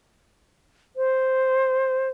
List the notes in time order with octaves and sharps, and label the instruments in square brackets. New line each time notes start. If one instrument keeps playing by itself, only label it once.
[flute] C5